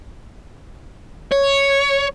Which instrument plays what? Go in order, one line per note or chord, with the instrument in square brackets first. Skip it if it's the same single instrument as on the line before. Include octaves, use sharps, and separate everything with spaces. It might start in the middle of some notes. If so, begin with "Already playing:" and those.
[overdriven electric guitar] C#5